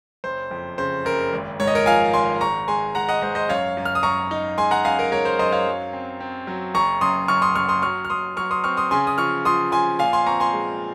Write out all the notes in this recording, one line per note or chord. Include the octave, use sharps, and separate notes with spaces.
F#1 C5
F2
C#3 C5
F#1 A#4
G#1
G#2 C#5
D#5
A#4 C#5
F3 F5 G#5
G#1 G#5 C6
G#2 A#5 C#6
G#3 G#5 C6
G#3 F#5 A#5
D#5 F#5
G#2 C5 D#5
C5 D#5
F#2 C#5 F5
F#2
F6
D#6
F#2 A#5 C#6
D#4
G#3 G#5 C6
F#5 A#5
F#2 F5 G#5
A#4
G#3 A#4 C#5
C5
F#2 C5 D#5
C#5 F5
F#3
C4
C4
F#3
F#1 A#5 C#6
F#2 C6 D#6
F#2 C#6 F6
C6 D#6
F#1 C#6 F6
C6 D#6
F#3 C#6 F6
F6
F#3 C6 D#6
F#3 C#6 F6
C6 D#6
C4 C#6 F6
C6 D#6
C#3 G#5 C6
D#6
F3 C#6 F6
F3 C6 D#6
F3 G#5 C6
A#2 F5 G#5
G#5 C6
C4 A#5 C#6
G#5 C6
G#3